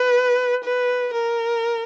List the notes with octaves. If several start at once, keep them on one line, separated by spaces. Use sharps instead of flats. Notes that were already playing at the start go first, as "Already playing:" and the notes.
Already playing: B4
B4
A#4